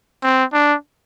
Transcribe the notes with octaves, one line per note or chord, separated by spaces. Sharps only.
C4
D4